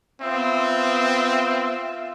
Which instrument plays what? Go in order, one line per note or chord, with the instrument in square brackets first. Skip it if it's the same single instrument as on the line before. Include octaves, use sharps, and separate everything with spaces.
[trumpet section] B3 [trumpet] C4 [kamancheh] F4 E5